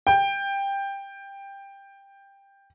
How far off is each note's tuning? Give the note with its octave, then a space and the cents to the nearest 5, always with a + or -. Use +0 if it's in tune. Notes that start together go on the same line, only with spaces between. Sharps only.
G5 +15